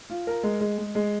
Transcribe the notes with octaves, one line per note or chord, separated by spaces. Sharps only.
F4
A#4
G#3
G#3
G#3
G#3